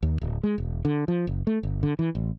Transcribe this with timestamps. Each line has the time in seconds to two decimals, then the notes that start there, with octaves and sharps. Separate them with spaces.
0.03 D#2
0.21 D1
0.43 G#3
0.58 E1
0.85 D3
1.08 F3
1.27 F#1
1.47 A3
1.63 G1
1.83 D3
1.99 E3
2.15 A1